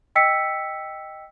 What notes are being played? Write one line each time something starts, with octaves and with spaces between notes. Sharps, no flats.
D#5 G5 E6 B6 C#7